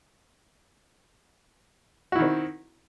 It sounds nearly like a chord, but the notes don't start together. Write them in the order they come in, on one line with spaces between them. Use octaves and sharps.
F#4 E4 D#3 C4